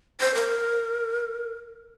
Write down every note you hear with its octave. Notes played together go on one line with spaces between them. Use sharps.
C5
A#4